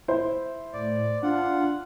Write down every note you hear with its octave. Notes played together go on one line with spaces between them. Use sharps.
E4 C5
A2 D5
D4 F4 F#5